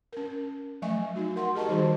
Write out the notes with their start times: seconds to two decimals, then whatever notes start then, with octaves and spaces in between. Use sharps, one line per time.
0.13 C#4 A#4
0.82 F3 F#3 A3 E5 G#5 C#6
1.16 D#4 F#4
1.36 A#4 F#5 C6
1.55 G4 G#4 D#5 A5 A#5 C#6
1.68 D#3 E3 G3 D#4 F#4 C5